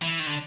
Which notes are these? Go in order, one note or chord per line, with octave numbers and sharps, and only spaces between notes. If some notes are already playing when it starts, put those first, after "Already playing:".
E3
D#3
D3